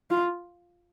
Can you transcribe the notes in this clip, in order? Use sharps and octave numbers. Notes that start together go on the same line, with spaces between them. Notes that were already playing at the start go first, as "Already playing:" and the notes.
F4